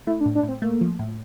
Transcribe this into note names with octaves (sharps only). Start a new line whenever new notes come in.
A3 E4
D4
A2
D4
A2
C4
A3 A#3
F3
A2